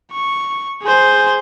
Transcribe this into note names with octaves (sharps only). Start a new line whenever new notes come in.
C#6
G#4 C5